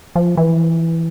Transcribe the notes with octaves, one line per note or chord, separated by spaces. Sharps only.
F3
E3